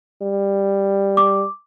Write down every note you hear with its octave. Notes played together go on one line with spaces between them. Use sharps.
G3
D6